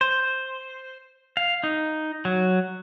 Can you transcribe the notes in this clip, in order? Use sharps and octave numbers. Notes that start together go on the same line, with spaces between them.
C5
F5
D#4
F#3